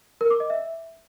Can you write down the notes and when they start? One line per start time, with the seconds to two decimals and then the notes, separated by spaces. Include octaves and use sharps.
0.21 A#4
0.30 D6
0.40 D#5
0.50 E5